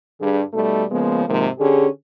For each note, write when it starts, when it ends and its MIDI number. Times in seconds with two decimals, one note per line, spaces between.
0.21 0.42 43
0.21 0.42 50
0.21 0.42 68
0.53 0.83 47
0.53 0.83 55
0.53 0.83 57
0.53 0.83 63
0.53 0.83 69
0.91 1.23 49
0.91 1.23 53
0.91 1.23 56
0.91 1.23 58
0.91 1.23 59
1.28 1.47 44
1.28 1.47 48
1.28 1.47 51
1.28 1.47 53
1.28 1.47 56
1.28 1.47 58
1.59 1.87 50
1.59 1.87 61
1.59 1.87 67
1.59 1.87 68